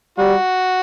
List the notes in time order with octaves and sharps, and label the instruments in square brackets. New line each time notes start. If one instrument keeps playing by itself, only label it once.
[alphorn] G3 [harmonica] F#4